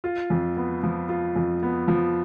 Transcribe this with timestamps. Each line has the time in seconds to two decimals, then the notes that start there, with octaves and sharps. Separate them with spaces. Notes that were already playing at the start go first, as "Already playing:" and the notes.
0.04 F4
0.30 F2
0.57 B3
0.83 F3
1.09 F4
1.36 F2
1.63 B3
1.88 F3